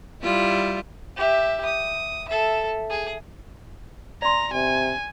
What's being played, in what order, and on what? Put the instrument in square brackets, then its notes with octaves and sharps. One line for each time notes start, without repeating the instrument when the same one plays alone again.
[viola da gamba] G3 E4 F4
[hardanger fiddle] G4 E5
D#6
A4 E5
G#4
[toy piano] D5 C6 [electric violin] A#5
[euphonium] C3 [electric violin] G#5